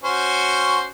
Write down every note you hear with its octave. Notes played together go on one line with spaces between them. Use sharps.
C#4 F#4 C5